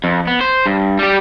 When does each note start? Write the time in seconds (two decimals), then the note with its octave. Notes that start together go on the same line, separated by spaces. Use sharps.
0.04 F2
0.27 B3
0.41 C5
0.66 G2
0.99 G3 G4